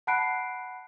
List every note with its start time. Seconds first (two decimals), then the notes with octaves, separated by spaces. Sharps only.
0.07 F#5 A5 B5 F#6 C7 D7